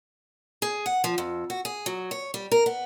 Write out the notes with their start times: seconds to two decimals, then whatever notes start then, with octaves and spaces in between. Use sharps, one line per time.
0.62 G#4
0.86 F#5
1.04 F3
1.18 F2
1.50 F#4
1.65 G#4
1.86 F#3
2.11 C#5
2.34 G3
2.52 A#4
2.66 B3